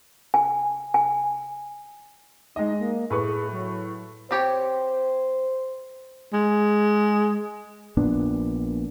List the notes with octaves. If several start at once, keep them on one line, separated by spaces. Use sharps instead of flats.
G#5
G#5
G#3 D#4 D#5
A#3
A2 G#4 B4 C#6
F#3
C4 G4 C5 C#5
G#3
A#1 A#2 B3 D4